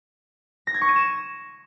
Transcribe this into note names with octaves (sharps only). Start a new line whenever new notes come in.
A#6
G#6
C#6
D#7
E7